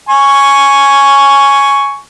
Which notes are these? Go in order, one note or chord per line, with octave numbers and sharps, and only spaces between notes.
G#5 C#6